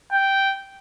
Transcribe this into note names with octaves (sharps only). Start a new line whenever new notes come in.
G5